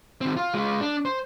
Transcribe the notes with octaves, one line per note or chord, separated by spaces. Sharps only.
D#3 C4
F4
G#3 F4
D4
C5